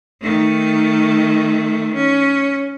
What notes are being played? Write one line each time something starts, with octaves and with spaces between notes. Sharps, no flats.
D#3 A3
C#4